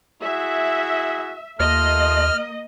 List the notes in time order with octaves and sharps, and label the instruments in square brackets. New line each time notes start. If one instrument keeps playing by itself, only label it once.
[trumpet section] E4 F#4 G#4 [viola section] E5
[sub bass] D#2 [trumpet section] A3 F4 C6 [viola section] A#3 D#5 [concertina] F6